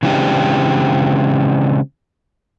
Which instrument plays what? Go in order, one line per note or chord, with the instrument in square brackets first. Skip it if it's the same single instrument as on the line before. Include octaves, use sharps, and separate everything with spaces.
[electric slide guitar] C#3 E3 G#3 C4 D4 G4